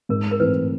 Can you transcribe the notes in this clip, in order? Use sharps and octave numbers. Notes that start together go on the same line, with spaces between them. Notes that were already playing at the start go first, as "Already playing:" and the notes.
G#2 A#4
A#4
E3 A3 C4 B4